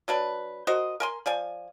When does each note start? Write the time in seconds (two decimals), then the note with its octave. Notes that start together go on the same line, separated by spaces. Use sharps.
0.08 F#3 D4 B4
0.67 F#4 A#4 C5 D#5
1.00 A#4 G#5 C6
1.26 F3 D5 G#5